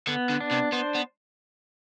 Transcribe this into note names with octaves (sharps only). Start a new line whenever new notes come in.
D3 B3
D3
D4
C3
B3 C5
B3